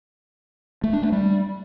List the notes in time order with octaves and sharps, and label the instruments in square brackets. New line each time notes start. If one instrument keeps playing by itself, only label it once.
[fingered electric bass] A3
D4
A3
G3